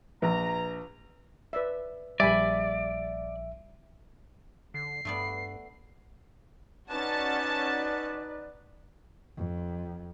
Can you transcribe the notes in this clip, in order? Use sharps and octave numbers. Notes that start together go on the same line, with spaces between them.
A#1 B4 A#5
B4 D5 E5
A#1 G3 D5 E5 G#5 B5
D3 C7
G2 A3 B3 D5
C#4 D#4 F#4 B4 D5 A5
F2